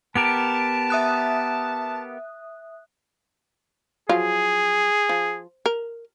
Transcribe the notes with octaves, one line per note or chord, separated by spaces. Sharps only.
B3 G4 A#4 A5 D7
E5 D#6 F#6
F3 F#3 F4 G#4
F3
A#4